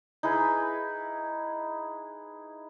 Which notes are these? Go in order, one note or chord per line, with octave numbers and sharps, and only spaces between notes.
D#4 E4 G#4 B4